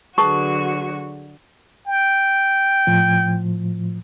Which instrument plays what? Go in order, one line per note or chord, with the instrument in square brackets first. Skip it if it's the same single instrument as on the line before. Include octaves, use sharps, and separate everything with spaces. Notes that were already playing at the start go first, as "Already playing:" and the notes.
[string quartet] D3 F#3 F#4 [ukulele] G#4 B4 A5 [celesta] C#6
[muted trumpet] G5
[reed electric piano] A2 F3